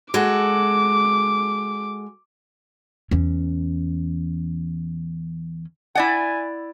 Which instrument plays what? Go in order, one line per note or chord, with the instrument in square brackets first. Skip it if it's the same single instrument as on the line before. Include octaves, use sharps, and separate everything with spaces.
[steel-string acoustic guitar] G#3 F#4 A4 [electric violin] D6
[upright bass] E2 C#4
[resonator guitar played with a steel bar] E4 D5 F#5 [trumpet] G#5